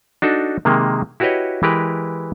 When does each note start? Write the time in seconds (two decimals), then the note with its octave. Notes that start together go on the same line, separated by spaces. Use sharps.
0.22 D4 D#4 F#4 A4
0.65 C3 D#3 G#3 A#3
1.20 E4 F#4 G4 B4 C#5 D#5
1.63 E3 G#3 G4 A#4 B4